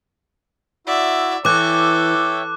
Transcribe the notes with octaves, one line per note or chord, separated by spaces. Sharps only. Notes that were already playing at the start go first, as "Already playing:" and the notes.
E4 F#4 D5 E5
E3 A4 C#5 E5 G5 D6 F#6